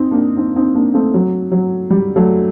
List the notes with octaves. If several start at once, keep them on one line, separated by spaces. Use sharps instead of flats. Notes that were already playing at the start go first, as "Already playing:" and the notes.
Already playing: C4 D#4
A#3 D4
C4 D#4
C4 D#4
A#3 D4
A3 C4
F#3
F#3
G3
F#3 A3